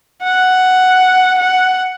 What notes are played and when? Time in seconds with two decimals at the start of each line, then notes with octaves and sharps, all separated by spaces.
0.23 F#5
1.38 F#5